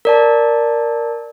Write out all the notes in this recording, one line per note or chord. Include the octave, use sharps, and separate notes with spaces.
A#4 D5 A5